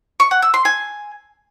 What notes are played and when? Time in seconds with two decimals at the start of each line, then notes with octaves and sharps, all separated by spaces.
0.20 C#6
0.31 F#5
0.42 E6
0.54 C6
0.65 G#5